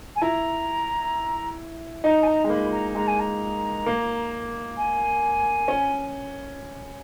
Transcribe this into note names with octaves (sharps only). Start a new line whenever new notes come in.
G#5
E4 A#5
D#4 A#5
G#5
A#5
G#3
A#3 B5
A#5
G#3 A#5
G#5
A#5
A#3
G#5
C#4